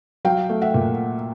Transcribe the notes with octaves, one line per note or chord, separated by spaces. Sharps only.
F#3 F5 G5
A3
E5 F#5
A#2